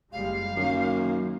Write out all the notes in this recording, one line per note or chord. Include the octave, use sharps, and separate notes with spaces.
F#1 G3 G#3 F5
F#2 D#3 A#3